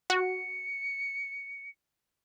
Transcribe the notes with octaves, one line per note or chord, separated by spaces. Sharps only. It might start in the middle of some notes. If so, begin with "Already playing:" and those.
F#4 C#7